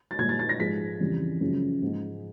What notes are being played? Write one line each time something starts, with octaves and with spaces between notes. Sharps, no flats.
A6
A#2 G3 G#6
A6
A6
A#6
G#2 F3 G#3 B6
F2 C#3 E3 G3
F#2 C#3 F3 G#3
G#2 F3 G#3